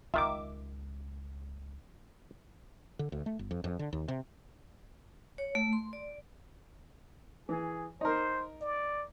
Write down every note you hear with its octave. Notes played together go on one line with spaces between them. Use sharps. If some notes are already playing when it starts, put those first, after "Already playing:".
C#2 D#3 G#3 F4 E5 D6
D3
D2
A3
G1
F2
F2
D3
D#2
C3
C#5
A3
C6
D5
E3 G#4
D#4 A#4 C5
D5